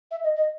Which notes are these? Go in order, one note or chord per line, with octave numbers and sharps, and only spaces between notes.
E5
D#5
D#5